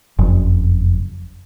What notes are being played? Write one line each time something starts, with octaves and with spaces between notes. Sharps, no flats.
F#1 F2